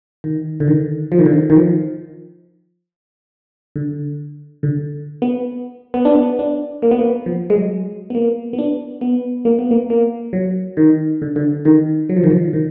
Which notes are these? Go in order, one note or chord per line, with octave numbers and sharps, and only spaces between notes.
D#3
D3
D#3
F3
D#3
D3
D#3
D#3
F3
D3
D3
B3
B3
D4
B3
D4
A#3
B3
A#3
F3
G#3
F#3
B3
A#3
B3
D4
B3
A#3
B3
A#3
A#3
F#3
D#3
D3
D3
D#3
F#3
F3
D#3
F3
D#3